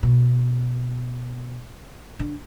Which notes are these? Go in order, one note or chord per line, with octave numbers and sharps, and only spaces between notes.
B2
D3